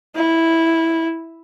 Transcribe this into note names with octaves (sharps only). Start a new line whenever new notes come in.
E4